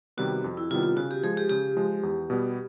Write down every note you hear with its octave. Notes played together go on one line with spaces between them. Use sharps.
C3 D#3 G3 B3 F#4
F2
E4
C3 D#3 G3 B3 F4
F4
C#3 F#4
G4
F3 G#3 G#4
G4
C#3 G4
F3 G#3
E2
B2 G3 B3